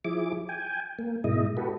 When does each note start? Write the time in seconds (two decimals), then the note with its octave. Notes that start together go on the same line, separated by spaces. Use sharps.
0.05 F3 E4 G#4 D6
0.49 G5 G#5
0.99 A#3
1.24 G#2 B2 G#3 E4 D#5
1.57 F#4 G4 A4 B4